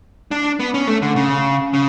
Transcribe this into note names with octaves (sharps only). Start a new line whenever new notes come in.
D4
B3
C#4
A3
D3
C#3
C#3